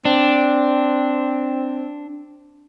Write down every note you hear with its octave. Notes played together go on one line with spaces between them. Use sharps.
C4 D4